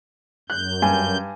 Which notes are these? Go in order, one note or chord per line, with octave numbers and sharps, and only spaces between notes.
F#2 F#6 G6
G2 G#5